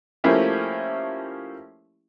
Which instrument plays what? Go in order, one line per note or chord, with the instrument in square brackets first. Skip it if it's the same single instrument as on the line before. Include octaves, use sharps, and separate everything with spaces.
[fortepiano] F3 A3 A#3 C#4 E4 G4